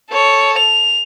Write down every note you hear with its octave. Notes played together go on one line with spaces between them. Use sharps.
A4 C#5
F7